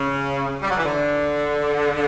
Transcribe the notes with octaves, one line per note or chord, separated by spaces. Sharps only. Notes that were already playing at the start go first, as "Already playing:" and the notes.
Already playing: C#3
G3
F#3
E3
D3